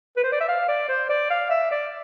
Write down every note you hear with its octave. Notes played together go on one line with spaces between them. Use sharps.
B4
C5
D5
E5
F5
D5
C5
D5
F5
E5
D5